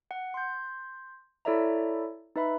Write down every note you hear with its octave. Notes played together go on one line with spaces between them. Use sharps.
F#5
C6 G6
E4 A4 C#5 D5 E5 A#5
D#4 B4 E5 B5